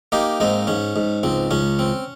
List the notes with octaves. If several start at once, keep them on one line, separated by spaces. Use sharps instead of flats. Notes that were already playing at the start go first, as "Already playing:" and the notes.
A#3 D#4 G4
G#2 C4 D#4
G#2 C#4
G#2
C#2 C4
C#2 C#4
C4